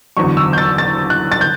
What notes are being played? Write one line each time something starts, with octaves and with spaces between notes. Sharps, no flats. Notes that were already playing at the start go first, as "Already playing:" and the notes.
F#1 E2 D3 F#3 C#6
E6
G6
A6
A6
F#6
A6
G6